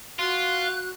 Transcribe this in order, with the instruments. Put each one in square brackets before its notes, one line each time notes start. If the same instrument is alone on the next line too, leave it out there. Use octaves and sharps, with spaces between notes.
[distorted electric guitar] F4 [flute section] F#4 F#6